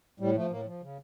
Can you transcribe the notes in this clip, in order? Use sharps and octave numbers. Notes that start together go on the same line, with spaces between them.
A2 G3
F3 A3
A2 A#3
F3
C#3